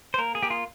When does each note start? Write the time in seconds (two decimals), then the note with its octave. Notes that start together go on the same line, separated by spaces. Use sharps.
0.14 C5
0.18 A#3 A#4
0.35 G#4
0.43 A#3 G4
0.50 F4